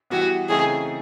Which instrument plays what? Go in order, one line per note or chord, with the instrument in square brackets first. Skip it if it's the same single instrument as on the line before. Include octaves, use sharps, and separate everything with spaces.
[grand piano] E3 G3 B3 [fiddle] F#4
[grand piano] C#3 E3 A3 C4 D#4 [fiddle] G#4